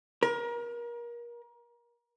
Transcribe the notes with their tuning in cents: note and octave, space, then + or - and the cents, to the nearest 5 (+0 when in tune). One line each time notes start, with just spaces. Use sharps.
A#4 +30